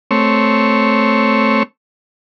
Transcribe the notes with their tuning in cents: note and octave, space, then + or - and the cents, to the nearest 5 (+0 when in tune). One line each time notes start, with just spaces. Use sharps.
A3 +0 C4 +0 C#5 +0